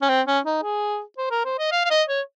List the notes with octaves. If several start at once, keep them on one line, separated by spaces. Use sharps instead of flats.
C#4
C4
C#4
D#4
G#4
C5
A#4
C5
D#5
F5
F5
D#5
C#5